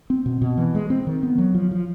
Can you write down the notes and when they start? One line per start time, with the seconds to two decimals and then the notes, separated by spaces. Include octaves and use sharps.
0.10 C4
0.26 B2
0.41 B2
0.58 E3
0.75 G#3
0.90 C4
1.07 D#3
1.23 B3
1.38 F#3
1.54 F3
1.71 F3